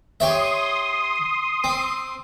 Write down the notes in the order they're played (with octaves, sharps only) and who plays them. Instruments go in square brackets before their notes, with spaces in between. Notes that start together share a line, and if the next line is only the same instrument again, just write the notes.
[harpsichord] G4 C#5 E5 [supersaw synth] C6 D#6
[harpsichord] C4